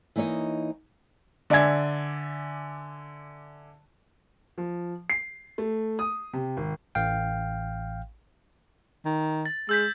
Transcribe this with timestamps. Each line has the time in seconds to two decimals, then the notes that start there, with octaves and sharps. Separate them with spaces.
0.16 E3 A#3 D#4 C#5 D#5
1.50 D3 D5 E5 G#5 G#6
4.58 F3
5.10 C7
5.58 A3
5.99 D#6
6.33 C3
6.57 G#1
6.95 A1 F5 G5
9.05 D#3
9.46 A6
9.69 G#3 E6 G6 B6